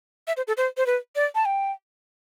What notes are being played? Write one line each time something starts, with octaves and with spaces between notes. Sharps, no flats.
E5
C5
A4
C5
C5
B4
D5
A5
G5